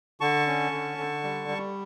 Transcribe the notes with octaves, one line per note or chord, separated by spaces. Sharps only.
D3 A5 C#6
C#4
D3
D3
G3
G3